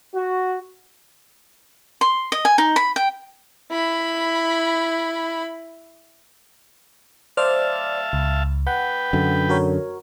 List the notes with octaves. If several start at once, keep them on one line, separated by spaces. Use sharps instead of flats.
F#4
C6
D#5
G#5
D#4
B5
G5
E4 B5
C5 D5 E5 F5 A5 F6
C#2
B4 F#5 G5
F#2 D3
F#4 A#4 C#5